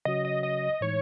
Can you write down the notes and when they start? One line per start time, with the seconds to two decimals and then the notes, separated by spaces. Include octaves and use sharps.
0.05 C#3 F#3 C#4 F#4 C#5 D#5
0.25 D#5
0.43 D#5
0.81 A2 E3 G#3 D#4 C#5